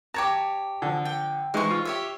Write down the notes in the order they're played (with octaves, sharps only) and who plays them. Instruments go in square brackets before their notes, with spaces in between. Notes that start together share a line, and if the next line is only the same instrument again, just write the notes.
[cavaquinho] G4 C#5 A5 [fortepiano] A#5 D6
[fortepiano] D3 F3
[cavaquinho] G5
[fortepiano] E3 G#3 D#4 [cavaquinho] C5 C#6
[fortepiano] F4
[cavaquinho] G4 C#5 E5